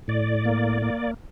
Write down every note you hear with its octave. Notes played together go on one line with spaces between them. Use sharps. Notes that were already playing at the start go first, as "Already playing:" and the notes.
A2 D5
A#3
A#3